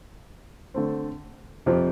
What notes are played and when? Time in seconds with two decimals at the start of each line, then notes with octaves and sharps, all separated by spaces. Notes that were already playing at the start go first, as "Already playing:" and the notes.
0.74 D3 A3 C4
1.66 F2 C3 F3 C4 G4